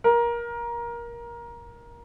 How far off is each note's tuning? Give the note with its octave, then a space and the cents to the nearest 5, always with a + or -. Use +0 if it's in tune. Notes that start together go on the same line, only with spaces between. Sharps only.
A#4 +20